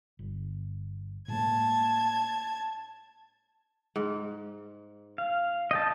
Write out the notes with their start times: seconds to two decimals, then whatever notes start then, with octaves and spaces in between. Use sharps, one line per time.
0.19 G1
1.28 A2 G#3 A#3 A5 G#6
3.96 G#2
5.18 F5
5.71 D#5 G5 A5